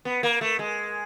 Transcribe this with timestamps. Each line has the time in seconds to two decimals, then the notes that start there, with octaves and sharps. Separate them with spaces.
0.05 B3
0.23 A#3
0.41 A3
0.59 G#3